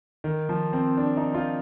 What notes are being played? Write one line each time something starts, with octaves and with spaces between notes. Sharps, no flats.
D#3
F3
C4
D4
D#4
F4